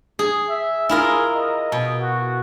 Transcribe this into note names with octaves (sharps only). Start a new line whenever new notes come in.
G#4
E5
E4 F4 G#4 A#4
D#5
B2
F#4